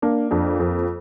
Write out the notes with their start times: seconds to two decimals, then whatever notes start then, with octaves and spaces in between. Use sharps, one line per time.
0.02 A#3 D4
0.31 F2 D4
0.59 F2 C4